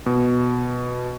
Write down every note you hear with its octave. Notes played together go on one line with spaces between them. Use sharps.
B2